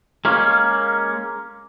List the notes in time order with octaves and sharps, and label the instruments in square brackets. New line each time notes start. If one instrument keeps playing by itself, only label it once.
[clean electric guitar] G#3 A#3 C#4